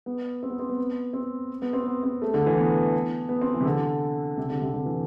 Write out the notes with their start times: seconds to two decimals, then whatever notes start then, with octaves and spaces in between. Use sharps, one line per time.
0.06 B3
0.43 C4
0.51 B3
0.59 C4
0.70 B3
1.13 C4
1.62 B3
1.73 C4
1.86 B3
2.03 C4
2.22 A3
2.34 D3
2.46 E3
2.58 B3
3.29 B3
3.41 C4
3.54 E3
3.61 C3
3.66 D3
4.37 C3
4.50 D3
4.62 C3
4.74 D3
4.86 E3